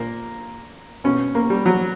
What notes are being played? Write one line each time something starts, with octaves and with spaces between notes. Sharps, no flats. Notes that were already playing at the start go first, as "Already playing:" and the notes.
Already playing: A#2 A#3
B2 C#4
A#3
G3
F#3